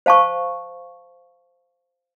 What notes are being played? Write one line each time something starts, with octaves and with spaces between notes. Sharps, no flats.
C5 F5 A5 C#6